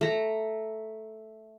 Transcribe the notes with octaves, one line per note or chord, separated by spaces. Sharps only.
A3 A#5